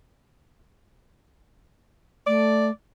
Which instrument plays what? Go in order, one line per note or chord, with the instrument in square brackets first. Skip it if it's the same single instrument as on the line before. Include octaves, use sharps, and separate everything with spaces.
[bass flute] A3 [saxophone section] D5